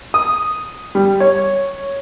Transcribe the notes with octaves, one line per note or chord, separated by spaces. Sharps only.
D#6
G3
C#5